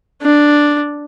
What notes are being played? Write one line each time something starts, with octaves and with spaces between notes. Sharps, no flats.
D4